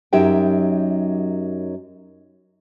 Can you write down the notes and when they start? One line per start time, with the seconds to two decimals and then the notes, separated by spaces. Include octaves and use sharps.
0.13 F#2 F#3 D#4 G4 E5 G5